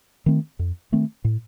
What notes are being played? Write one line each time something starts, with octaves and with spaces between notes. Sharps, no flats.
D#3 A3 C4
F2
D#3 A3 C4
A2